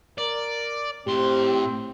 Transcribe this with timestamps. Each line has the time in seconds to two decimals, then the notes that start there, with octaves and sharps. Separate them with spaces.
0.18 A#4 D5
1.07 A2 C4 G4 C6